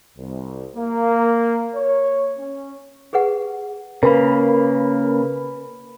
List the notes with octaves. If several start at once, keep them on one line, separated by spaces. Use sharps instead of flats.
C2
A#3
C#5
C#4
G4 G#4 B4 F#5
C#3 A#3 A#4 B4 B5